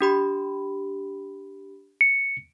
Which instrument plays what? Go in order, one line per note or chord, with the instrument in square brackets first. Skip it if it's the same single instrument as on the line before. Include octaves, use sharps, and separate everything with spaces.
[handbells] D4 G4 B5
[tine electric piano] C#7